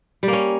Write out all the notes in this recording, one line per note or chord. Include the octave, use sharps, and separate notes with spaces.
G3 A#3 C#4